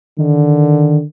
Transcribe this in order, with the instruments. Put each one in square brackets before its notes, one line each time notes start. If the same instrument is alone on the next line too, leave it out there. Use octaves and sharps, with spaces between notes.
[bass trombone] D3 [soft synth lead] D#3